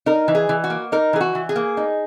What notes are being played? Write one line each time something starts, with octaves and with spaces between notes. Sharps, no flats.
D#4 A#4
E3
G#4
E3
F#4
A#3
D#4 A#4
E3 G#4
F#4
E3
G#4
A#3
D#4